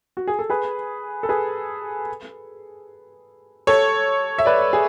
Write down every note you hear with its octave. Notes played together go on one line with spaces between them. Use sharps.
F#4
G#4
A4
G#4 B4
A4
G#4 B4
A4 C#5
E5
B4 D5
G#4